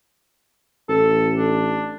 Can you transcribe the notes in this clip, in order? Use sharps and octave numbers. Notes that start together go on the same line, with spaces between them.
A1 A4
D4